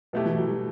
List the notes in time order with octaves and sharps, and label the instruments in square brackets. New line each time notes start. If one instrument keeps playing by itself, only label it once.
[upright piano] B2 A3 E4 G4 [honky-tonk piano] F#3
[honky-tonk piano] E3
F#3
G3